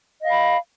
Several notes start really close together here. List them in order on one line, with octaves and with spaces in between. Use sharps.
D#5 F5 B5